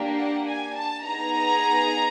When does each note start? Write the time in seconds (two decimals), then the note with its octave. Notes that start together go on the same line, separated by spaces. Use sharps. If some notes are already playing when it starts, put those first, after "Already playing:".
Already playing: A#3 D4 G4
0.17 F#5
0.47 G#5
0.76 A5
1.04 B3 D#4 G#4 A#5